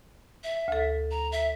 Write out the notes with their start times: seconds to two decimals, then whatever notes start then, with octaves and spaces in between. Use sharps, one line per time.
0.44 E5
0.68 D2 A4
1.11 A#5
1.32 E5